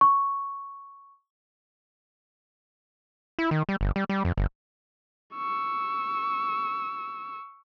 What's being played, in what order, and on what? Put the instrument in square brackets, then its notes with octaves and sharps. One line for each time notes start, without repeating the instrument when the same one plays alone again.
[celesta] C#6
[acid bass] E4
D#3
G3
G1
G3
G3
F2
G1
[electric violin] C#6 E6